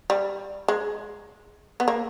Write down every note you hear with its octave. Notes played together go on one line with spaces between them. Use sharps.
G3
G#3
B3
A#3